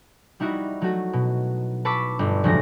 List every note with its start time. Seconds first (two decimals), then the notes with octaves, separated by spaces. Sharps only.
0.40 G3 D#4 E4 F#4
0.81 F#3 A3 F#4
1.13 B2
1.85 B4 A5 C#6 D6 E6 B6
2.19 G1
2.44 F1 D2 F#3 G#3 A#6